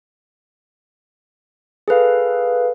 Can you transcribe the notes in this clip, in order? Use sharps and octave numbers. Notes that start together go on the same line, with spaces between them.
G#4 A4 B4 F5